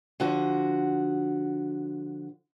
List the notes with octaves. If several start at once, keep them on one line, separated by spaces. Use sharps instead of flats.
D3 F3 F#4